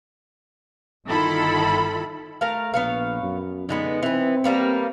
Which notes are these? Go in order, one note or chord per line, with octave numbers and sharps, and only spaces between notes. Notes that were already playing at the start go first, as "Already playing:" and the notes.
G1 D#3 E4 F4 A4 B5
A3 A#4 F5
A#1 B3 C#5 F5
F#2
D3 G#3 B3 D#4
E3 B3 C4
G3 A#3 B3